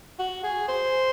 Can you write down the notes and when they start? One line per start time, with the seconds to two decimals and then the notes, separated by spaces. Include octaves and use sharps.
0.19 F#4
0.43 G#4
0.68 C5